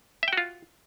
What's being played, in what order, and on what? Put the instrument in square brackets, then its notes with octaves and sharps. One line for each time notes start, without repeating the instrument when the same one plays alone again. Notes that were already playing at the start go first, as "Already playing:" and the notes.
[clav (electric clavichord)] E5
G5
F#4
F4